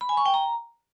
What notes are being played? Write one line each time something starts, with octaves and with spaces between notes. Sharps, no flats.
B5
G#5
C#6
G5
A#5